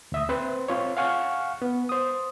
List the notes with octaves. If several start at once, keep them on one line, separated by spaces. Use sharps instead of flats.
D2 E5 D#6
C4 B4 C5
C4 F4 C#5
F5 F#5 G#5 C#6 F6
B3
C5 D#6